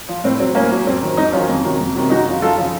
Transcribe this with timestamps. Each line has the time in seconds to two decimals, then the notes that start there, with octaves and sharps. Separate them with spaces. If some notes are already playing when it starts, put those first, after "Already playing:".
0.08 F3
0.24 A2 C4
0.40 F#3 C4
0.55 A2 A#3 C#4
0.71 F#3
0.78 C#4
0.86 F2 C4
1.02 D#3 F#3
1.17 F2 C4 D#4
1.32 D#3 F#3 C#4 F4
1.49 F2
1.64 C3 D#3 F#3
1.80 F2
1.95 C3 D#3 F#3
2.10 F#2 D#4 F#4
2.26 C#3 F3
2.42 F#2 F4 A4
2.57 C#3 F3